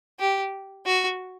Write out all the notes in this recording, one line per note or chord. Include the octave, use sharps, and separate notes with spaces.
G4
F#4